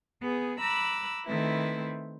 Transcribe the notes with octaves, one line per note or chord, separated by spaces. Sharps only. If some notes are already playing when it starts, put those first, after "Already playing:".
B3 G#4
A#5 B5 D6 E6 F#6
D#3 A3 C4 E4 B4